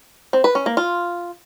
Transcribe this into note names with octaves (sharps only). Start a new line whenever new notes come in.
C4
B4
C#4
A#3
F4